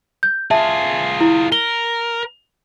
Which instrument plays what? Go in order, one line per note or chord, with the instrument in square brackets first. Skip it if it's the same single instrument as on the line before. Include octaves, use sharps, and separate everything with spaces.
[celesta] G6
[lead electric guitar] F4 G#4 [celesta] E5 A5
[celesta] E4
[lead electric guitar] A#4 [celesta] G7